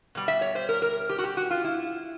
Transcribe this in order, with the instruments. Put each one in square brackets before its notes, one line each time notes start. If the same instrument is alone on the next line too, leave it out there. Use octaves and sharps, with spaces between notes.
[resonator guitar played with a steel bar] B2 G3
E5
C#5
C5
A#4
A#4
G4
F#4
G4
F#4
F4
E4